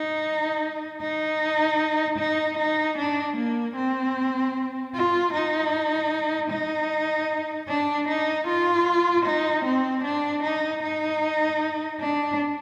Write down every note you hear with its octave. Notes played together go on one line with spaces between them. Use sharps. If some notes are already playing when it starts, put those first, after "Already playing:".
Already playing: D#4
D#4
D#4
D#4
D4
A#3
C4
F4
D#4
D#4
D4
D#4
F4
D#4
C4
D4
D#4
D#4
D4